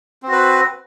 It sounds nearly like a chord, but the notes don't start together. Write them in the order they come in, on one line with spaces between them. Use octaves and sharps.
C4 F#4 B4